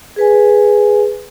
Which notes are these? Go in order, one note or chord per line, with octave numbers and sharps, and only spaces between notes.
G#4 B4 G#5